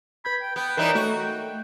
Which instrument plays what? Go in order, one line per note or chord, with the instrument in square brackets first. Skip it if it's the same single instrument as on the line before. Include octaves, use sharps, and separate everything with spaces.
[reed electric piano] B4 G6 G#6 [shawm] B5
[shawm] G5
[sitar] B3 [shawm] G5
[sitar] E3 G3 D#4 [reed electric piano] A#4 C#5 A#5
[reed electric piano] A3 [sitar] F#4
[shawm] G5